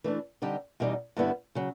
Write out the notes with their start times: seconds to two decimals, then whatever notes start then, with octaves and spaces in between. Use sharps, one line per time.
0.04 E3 A3 D4
0.42 D3 G3 C4 D#4 G4
0.80 E2 B2 G3 C4 D#4
1.17 G2 D3 G3 B3 E4
1.55 C#3 F#3